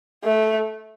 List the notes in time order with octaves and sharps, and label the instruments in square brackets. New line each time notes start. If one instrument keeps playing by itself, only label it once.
[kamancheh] A3